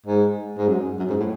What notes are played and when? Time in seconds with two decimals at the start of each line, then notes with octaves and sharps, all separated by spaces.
0.06 G#2
0.57 G#2
0.68 F#2
0.99 F#2
1.09 G#2
1.20 A2